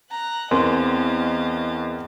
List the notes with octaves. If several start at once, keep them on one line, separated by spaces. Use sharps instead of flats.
A#5 F#6
E2 C4 A#4 D#5 F5 C6